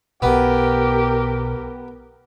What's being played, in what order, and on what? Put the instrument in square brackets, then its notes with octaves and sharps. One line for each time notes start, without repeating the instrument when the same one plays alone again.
[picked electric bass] B1 B2 [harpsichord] B3 [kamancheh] G4 A#4